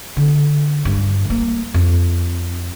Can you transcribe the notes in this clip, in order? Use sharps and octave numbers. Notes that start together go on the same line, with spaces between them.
D3
G2
A#3
F2